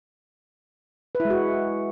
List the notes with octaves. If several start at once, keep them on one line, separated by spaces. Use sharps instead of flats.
B4
E4
G#3
F#4